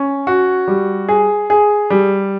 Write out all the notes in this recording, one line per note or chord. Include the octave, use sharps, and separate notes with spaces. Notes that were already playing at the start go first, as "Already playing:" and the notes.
Already playing: C#4
F#4
G3
G#4
G#4
G3